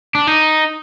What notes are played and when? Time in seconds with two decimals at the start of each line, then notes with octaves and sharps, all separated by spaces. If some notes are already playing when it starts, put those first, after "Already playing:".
0.15 D4
0.27 D#4